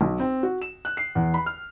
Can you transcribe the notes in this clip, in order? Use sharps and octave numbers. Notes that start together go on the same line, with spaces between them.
B1
C4
F#4
E7
F#6
C7
E2
B5
F6